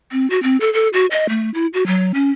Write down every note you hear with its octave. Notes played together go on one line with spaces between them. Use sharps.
C4
F#4
C4
A4
A4
F#4
D#5
A3
E4
F#4
F#3
C#4